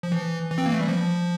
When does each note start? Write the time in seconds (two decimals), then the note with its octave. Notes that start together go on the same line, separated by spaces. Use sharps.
0.03 F3
0.12 E3
0.50 E3
0.58 C4
0.66 A#3
0.72 A3
0.81 G3
0.88 F3